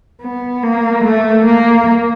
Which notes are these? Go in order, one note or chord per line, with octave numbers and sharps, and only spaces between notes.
B3
A#3
A3
A#3